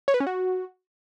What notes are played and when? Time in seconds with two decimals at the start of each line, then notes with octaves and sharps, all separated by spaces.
0.08 C#5
0.14 B4
0.20 C#4
0.27 F#4